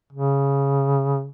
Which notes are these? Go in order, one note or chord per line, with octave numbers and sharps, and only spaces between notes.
C#3